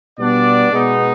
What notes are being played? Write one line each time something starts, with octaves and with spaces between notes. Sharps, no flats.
B2 G3 B3 D4 D5
B2 G#3 B3 D#4